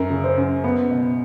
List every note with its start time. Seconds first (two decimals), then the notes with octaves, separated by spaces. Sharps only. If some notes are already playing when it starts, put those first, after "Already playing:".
Already playing: F#2 A#4
0.10 C#3
0.24 C5
0.38 F#2
0.64 B3
0.91 B2